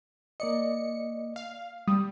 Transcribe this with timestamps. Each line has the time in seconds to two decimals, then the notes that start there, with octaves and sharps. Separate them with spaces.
0.40 A#3 D5 D#5 C#7
1.36 F5
1.88 G3 D#6